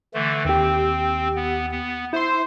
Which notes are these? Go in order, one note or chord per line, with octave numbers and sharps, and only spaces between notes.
D3 E3 A3
D#2 C4 G4
B3
B3
E4 C5 C6